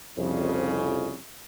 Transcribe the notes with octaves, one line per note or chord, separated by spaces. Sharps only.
C2 F2 C#3